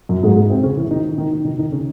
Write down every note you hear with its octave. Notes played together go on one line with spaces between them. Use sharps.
F#2 F#3
G#2 G#3
G#2 G#3
C3 C4
C#3 C#4
E3 E4
D#3 D#4
D#3 D#4
D#3 D#4
D#3 D#4
C#3 C#4